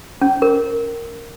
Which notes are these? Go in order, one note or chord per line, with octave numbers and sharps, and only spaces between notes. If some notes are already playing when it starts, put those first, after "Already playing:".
C#4
A#4